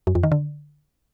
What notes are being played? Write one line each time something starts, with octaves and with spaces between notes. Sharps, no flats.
F#2
F2
D#3
D3